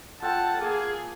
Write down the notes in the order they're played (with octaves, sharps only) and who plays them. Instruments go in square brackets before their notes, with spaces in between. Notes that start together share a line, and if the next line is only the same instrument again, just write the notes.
[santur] F4 A4 G5 [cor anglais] F#5 [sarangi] A5
[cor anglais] A#3 [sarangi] G#4